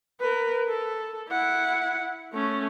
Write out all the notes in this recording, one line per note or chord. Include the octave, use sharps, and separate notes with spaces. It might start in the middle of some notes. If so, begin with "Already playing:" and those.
A#4 B4
A4
E4 F#5
A3 C#4